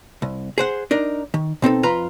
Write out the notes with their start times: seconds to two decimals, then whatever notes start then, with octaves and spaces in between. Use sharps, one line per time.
0.22 C2
0.58 G#4 C5 F#5
0.91 D4 D#4 A#4
1.34 D#3
1.62 B2 C4 D#4 A4
1.83 F2 F4 B4 A#5 B5